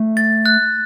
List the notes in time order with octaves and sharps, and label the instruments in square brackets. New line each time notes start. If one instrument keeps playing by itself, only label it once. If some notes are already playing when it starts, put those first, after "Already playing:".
Already playing: [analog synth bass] A3
[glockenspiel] A6
F#6